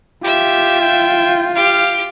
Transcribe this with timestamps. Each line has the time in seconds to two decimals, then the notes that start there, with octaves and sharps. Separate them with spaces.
0.24 F4 G4 E5
0.81 G5
1.55 G4 F5